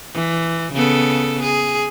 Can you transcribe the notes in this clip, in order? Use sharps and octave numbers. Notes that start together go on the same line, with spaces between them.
E3
C#3 B3 A4
G#4